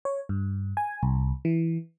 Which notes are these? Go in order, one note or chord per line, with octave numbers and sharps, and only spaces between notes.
C#5
G2
G#5
C2
E3